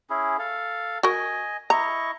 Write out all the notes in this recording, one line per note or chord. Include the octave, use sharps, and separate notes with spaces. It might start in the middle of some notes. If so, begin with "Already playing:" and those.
C#4 E4 G#4
A4 F5
F#4 A#4 D#5 G#5
E4 D#5 A#5 C#6